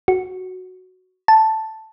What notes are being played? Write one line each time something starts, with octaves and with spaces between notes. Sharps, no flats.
F#4
A5